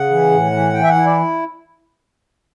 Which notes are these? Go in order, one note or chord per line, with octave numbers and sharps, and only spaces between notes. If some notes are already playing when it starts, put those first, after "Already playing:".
Already playing: C#3 F#5
E3
A2
E3
E3 G5
E5
F#5
E4
D5